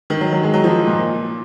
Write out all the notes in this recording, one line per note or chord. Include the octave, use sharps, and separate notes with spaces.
D#3
F#3
F#3
G#3
F#3
F3
A#2